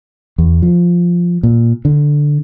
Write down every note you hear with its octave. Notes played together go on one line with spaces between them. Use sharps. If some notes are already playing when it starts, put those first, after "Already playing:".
E2
F3
A#2
D3